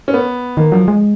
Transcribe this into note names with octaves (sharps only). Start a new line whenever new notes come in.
C#4
B3
D#3 A#3
F3 F#3
G#3